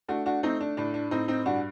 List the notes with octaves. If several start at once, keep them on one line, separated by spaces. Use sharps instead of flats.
A3 D4 F#4
D4 F#4
A3 C4 D#4
D4
A2 D4
D4
A2 C4 D#4
C4 D#4
G2 D4 F#4